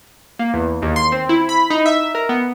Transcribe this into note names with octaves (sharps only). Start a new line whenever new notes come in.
A#3
E2
D#2
C6
C4
E4
B5
D#4
E5
A#4
B3